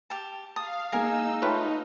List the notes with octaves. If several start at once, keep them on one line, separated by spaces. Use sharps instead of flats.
G4 A5
F5 A5 D#6
G#3 A#3 D#4 A#4 F5 G#5 E6
A3 D#4 F4 B4 C#5 G5 A5